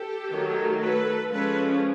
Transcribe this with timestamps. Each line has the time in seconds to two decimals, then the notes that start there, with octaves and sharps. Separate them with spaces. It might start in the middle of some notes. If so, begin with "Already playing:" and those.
Already playing: G4 A4
0.31 D#3 F#3 A3
0.81 A4 B4
1.30 F3 G#3 C#4 A4 B4